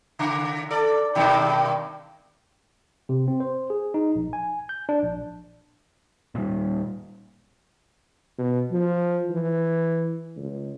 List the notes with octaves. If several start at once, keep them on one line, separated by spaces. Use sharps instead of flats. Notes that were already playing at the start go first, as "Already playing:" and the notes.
C#3
A4 D5
G2 B2 D#3
C3
C4
C5
G#4
D#4
A#1
G#5
G6
D4
A#1
A#2 G3
B2
F3
E3
C#2